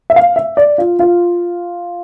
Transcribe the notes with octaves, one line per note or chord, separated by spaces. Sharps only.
E5
F5
E5
D5
F4
F4